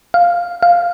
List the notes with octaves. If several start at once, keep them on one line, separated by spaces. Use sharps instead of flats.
F5
F5